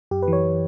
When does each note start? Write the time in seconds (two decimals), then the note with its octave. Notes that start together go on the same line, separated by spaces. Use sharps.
0.11 F#2 G4
0.22 B4
0.28 E3
0.33 C#5